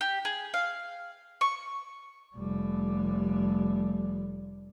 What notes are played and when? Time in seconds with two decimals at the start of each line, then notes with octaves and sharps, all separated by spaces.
0.01 G4
0.25 G#4
0.54 F5
1.41 C#6
2.36 F1 G3